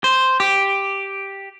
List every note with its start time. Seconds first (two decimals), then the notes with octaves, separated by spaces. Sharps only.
0.04 C5
0.40 G4